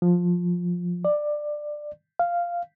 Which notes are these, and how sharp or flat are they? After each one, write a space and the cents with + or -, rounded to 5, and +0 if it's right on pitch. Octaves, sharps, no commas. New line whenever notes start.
F3 +15
D5 +15
F5 -5